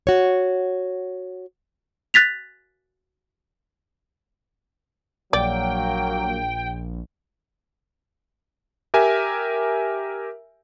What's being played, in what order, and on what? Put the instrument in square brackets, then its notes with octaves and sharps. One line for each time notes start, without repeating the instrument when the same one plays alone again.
[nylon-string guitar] F#4 C#5
[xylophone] F#6 A6 B6 F7
[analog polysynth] A#1 [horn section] F#3 A#3 [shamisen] D5 [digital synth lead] G5
[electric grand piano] G4 A#4 E5 G#5